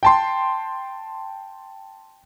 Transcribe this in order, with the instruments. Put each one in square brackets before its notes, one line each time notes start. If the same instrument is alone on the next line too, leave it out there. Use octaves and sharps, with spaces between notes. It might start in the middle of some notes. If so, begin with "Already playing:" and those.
[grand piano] G5 A5 C6